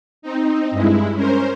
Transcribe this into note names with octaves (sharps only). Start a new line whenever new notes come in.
C4 D#4
G2 G#3 E4
C#4 A#4 C5